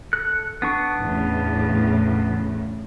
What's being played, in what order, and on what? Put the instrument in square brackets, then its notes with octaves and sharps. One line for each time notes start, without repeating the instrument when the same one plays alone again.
[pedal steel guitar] A4 F#6
B3 D4 C#6
[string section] E2 A2 C#3